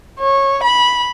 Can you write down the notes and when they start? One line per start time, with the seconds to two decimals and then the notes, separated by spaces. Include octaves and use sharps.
0.19 C#5
0.63 B5